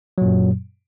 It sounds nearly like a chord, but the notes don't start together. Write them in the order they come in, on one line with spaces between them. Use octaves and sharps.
F#3 A#2 F#2